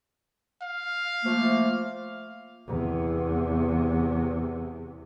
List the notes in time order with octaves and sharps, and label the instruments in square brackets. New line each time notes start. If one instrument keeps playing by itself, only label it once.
[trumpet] F5
[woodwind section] F3 A3 A#3
[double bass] E2 C3